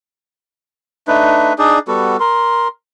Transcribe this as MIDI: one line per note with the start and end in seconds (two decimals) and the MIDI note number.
1.08 1.53 57
1.08 1.53 62
1.08 1.53 63
1.08 1.53 71
1.59 1.79 62
1.59 1.79 63
1.59 1.79 68
1.59 1.79 74
1.88 2.17 55
1.88 2.17 59
1.88 2.17 66
1.88 2.17 69
2.20 2.68 70
2.20 2.68 84